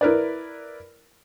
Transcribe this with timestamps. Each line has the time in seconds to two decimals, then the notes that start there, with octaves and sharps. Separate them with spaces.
0.01 E4 A#4 B4 D5